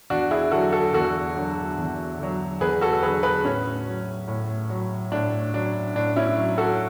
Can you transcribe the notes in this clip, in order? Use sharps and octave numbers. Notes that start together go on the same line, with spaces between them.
E2 D4 F#4
E4 G#4
D3 F#3 F#4 A4
F#4 A4
E2 F#4 A4
D3 F#3
E2
D3 F#3
E2 G#4 B4
F#4 A4
D3 F#3 G#4 B4
G#4 B4
A2 C#4
F#3
A2
F#3
A2 D4
F#3 D4
A2 D4
C#4 E4
F#3
F#4 A4